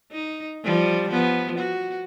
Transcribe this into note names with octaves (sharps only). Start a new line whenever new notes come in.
D#4
F3 G3
F3 B3
F#4